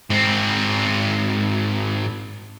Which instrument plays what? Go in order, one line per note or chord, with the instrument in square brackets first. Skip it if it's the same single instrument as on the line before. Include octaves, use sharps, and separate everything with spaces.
[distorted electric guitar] G#2 C4